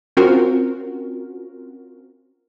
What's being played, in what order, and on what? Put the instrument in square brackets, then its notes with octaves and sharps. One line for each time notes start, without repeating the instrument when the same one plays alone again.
[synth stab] C4 C#4 F4 F#4 A#4